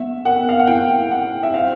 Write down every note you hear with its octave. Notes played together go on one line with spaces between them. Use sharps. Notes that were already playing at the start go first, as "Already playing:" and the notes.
Already playing: B3 E5
A#4 F#5
F5
F#5
E4 G5
E4 F#5
E5
C5 F5